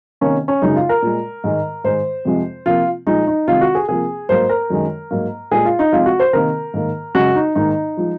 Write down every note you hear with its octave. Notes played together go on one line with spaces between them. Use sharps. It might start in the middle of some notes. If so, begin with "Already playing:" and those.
C3 D#3 A#3 C#4
C#4
F#2 C#3 G#3 D#4
F4
A#4
A#2 G#3
G#2 D#3 G#3
G#2 D#3 G#3 C5
F2 C3 F3 G#3
C3 F3 A#3 F4
A#2 F3 G#3 D#4
D#4
C3 D#3 G#3 F4
F#4
G#4
C3 F3 A#3 G#4
G#2 F#3 A#3 C5
A#4
F#2 D#3 G#3
G#2 F#3 A#3
A#2 G#3 G#4
F4
D#4
F2 C3 F3 G#3 F4
F#4
C5
C3 D#3 A#3 A#4
G#2 D#3 A#3
F#2 C#3 G#3 F#4
D#4
G#2 D#3 A#3 D#4
F3 G#3